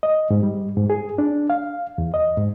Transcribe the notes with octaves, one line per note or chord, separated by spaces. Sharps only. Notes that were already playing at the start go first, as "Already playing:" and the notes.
D#5
G#2
G3
G#2
G#4
D4
F5
E2
D#5
G#2